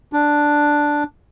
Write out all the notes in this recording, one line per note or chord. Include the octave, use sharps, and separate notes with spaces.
D4